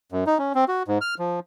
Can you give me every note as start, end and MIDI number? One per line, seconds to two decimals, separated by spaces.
0.12 0.24 42
0.27 0.38 63
0.38 0.53 61
0.55 0.65 60
0.68 0.83 66
0.88 0.98 44
1.01 1.15 89
1.19 1.40 53